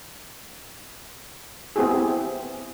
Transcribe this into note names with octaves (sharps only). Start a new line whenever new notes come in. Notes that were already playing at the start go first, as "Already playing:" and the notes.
B3 C4 E4 G4 G#4